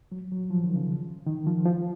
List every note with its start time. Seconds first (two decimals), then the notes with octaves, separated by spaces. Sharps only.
0.12 F#3
0.31 F#3
0.50 F3
0.63 D#3
0.76 C#3
1.27 D#3
1.46 F3
1.65 F3